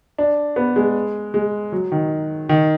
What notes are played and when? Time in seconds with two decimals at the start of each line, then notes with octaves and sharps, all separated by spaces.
0.18 D4
0.56 B3
0.76 G#3
1.34 G#3
1.72 F#3
1.92 D#3
2.49 D#3